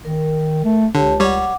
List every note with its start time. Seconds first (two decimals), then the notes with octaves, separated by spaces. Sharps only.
0.05 D#3 A#4
0.65 A3
0.95 C#2 D3 G4 C#5 A5
1.20 G3 C#5 F#5 D6